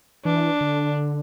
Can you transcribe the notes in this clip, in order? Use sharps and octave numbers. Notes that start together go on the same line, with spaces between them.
E3 D4
D3